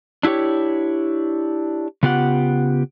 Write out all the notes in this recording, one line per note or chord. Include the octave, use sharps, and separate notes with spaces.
D4 E4 F4 G4 C#5
C#3 B3 F4 G4 F#5